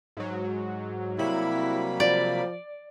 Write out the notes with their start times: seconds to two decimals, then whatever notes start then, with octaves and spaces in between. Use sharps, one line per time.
0.17 G#2 F#3
1.18 C3 F#3 G3 A#3 E4 B5
2.00 F3 D5